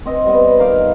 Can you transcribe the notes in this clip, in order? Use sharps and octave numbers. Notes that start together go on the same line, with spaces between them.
C4 D#5
G3 B3
D#3 D#4 F5 D6